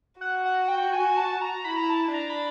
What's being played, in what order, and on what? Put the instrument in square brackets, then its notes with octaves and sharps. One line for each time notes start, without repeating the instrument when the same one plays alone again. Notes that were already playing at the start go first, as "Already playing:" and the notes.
[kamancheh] F#4 [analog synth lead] F#5
[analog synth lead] F#5
G5
G#5
A5
A#5
[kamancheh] E4 [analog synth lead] B5
[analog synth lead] A#5
A5
[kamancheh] D4 [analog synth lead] A#5
[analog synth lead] B5